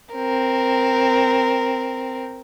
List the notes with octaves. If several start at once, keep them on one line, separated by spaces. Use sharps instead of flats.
C4 A#4